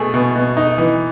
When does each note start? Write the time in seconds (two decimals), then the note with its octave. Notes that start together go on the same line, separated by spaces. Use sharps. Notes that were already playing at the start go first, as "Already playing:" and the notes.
Already playing: B2 A3 G#4
0.14 B2
0.36 B2
0.57 D#4
0.78 E3